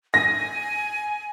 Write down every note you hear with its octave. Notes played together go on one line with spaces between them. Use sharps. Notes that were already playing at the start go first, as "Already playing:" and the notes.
G#5 A#6